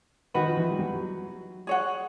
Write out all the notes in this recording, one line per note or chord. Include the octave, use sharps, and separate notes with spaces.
D#3 D#4 F#4 B4
F3
E3
G3
F#3
G#4 C#5 F#5